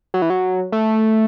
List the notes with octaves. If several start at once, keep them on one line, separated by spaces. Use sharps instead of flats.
F#3
E3
F#3
A3